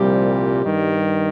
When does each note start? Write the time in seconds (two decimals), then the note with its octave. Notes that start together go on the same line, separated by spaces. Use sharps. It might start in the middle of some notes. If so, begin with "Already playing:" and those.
Already playing: C2 A#2 F3 G3 G4
0.65 G2 D#3